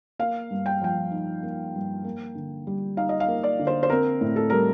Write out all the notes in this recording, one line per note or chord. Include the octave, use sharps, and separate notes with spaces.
A#3 F5
G2
G5
F3 G5
D#4
A#3
G2
A#3
D3
G3
D#4 F5
D#5
F5
A#3
D5
D3
C5
C5
C4 A#4
A2
A4
G3 A#4